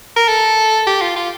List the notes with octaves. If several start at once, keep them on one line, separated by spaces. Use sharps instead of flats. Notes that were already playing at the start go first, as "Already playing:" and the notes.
A#4
A4
G4
F4
F4